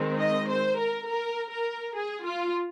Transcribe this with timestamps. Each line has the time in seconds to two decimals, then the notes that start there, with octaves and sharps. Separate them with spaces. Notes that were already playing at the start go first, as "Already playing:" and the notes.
Already playing: D#3 G#3 C4
0.20 D#5
0.50 C5
0.79 A#4
1.07 A#4
1.52 A#4
1.96 G#4
2.25 F4